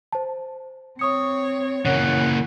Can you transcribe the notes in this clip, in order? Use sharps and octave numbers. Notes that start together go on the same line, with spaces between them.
C5 A5
C4 C#5 C#6 D#6 C#7
A#2 C#3 E3 A#3 C#5 F#5